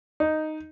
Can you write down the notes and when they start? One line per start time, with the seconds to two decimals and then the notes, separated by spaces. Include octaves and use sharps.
0.20 D#4